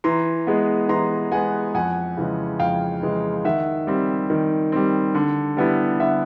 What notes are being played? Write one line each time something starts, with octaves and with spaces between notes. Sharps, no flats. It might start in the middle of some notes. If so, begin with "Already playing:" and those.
E3 A#5 C6
G#3 B3
E3 A#5 C6
G#3 B3 F#5 G#5
F2 F#5 G#5
C#3 E3 G#3
F2 F5 G5
C#3 E3 G#3
D#3 E5 F#5
G3 C4
D#3
G3 C4
D3
G3 B3 E4
D3 E5 F#5